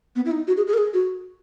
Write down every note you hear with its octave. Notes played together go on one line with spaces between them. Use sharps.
B3
E4
D#4
F#4
G#4
G#4
A#4
G#4
F#4